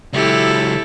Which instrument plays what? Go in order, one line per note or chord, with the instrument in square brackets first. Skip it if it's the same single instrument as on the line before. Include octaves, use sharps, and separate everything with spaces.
[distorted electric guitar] C#2 F#3 [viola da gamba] E4 G4 A4